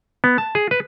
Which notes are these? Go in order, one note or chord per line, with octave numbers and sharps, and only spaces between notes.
B3
A5
G#4
B4